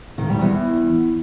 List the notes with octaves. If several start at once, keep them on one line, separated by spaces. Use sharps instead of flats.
D#3
G3
E2